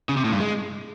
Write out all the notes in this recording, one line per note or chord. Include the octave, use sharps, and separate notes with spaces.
C#3
C3
A2
G2
G#3